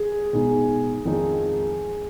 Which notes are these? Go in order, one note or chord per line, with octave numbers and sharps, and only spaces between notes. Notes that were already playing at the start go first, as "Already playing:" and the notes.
Already playing: G#4
B2 G#3 D#4
F2 D#3 G#3 D#4